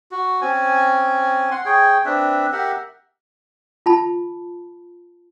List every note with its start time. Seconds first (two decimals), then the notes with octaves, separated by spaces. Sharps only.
0.11 F#4
0.41 C4 C#4 G#5
1.51 F#5 C6
1.65 G#4 C#5 G5
2.05 C4 D4 B4 E5
2.53 G4 A#4 E5 F#5
3.86 F4 A5 B5